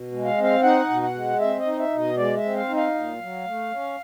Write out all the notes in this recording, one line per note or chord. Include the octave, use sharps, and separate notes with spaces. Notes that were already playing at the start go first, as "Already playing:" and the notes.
Already playing: B2
G#3
F5
C4
F5
D#4 F#5
B2
F#5
G#3
C4 E5
D#5
D#4
E5
B2
D#5
G#3 D5
E5
C4
F5
D#4
F5
A#2
F#3
A3
C#4